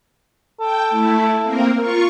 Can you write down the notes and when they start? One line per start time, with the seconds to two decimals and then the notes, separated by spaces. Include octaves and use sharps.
0.60 A4 G5
0.90 A3 E4
1.41 A#3 C4 A#4
1.78 F4 A#4 C#6